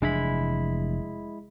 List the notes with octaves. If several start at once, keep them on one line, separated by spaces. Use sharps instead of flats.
F1 E3 G#3 D4 E4 B5